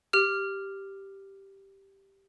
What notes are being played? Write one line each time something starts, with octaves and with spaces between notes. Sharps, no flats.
G4 F6